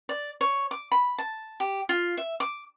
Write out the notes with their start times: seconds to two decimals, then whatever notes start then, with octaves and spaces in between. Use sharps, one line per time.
0.09 D5
0.41 C#5
0.71 D6
0.92 B5
1.18 A5
1.60 G4
1.89 F4
2.17 E5
2.40 D6